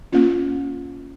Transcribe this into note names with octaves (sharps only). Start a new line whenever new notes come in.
A#3 C#4 F4